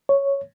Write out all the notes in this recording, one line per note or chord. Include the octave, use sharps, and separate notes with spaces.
C#5